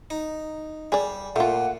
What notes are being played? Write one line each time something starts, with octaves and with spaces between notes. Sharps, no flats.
D#4
G3 G#4 D5
A#2 A3 F4 F#5